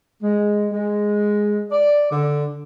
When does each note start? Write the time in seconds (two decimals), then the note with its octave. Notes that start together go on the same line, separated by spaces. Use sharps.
0.23 G#3
0.72 G#3
1.71 D5
2.10 D3